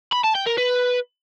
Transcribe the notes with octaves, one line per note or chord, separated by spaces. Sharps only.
B5
A5
G5
A#4
B4